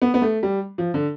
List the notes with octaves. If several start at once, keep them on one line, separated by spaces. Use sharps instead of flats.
B3
B3
A3
G3
F3
D3